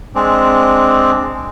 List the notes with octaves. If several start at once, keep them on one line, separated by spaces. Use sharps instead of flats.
G#3 C4 D4